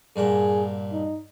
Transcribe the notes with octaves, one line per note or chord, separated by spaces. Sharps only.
G2 A#2 G#4 F#5
D#4